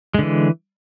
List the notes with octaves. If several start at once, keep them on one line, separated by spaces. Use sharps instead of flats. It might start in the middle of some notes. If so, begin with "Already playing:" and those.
D3 E3 G#3